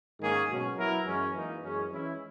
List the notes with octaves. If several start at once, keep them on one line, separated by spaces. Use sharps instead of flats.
G#2 D#3 A#3 C#4 G#4
B2 F#3 C#4
F#3 B3 E4 A#4
F#2 E3 G#3 C#4
E3 A#3 D#4
F#2 E3 G#3 C#4 G#4
E3 G#3 C#4 E4